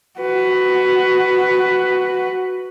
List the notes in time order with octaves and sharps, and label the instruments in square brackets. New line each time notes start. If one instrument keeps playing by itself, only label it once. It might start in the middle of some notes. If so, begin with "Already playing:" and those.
[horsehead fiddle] F#4 B4